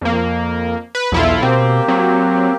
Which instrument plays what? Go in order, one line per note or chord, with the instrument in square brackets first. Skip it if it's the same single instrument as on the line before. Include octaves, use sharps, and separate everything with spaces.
[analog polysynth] F2 A#3
B4
[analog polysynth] B1 E4 F4 [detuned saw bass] E2 [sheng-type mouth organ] A4
[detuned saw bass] B2 [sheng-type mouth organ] A#3 G4 [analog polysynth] C4
[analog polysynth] F#3 [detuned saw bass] C4